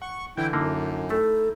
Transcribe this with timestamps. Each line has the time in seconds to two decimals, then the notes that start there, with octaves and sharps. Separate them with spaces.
0.02 F#5 C#6
0.37 D3 E3 E4 G5 G6
0.53 F#2 D3 A#3 D#4 E4
1.10 A3 A4